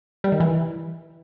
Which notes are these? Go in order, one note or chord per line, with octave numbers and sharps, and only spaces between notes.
G3
D#3
E3